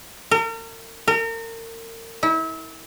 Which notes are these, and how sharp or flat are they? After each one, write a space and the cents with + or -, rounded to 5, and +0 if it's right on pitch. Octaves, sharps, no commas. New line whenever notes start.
A#4 -40
A#4 -35
E4 -35